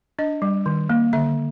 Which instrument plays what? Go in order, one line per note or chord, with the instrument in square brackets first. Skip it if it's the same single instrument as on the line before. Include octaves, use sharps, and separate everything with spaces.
[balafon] D4 D#5
G3
D#3
A#3
D3 E5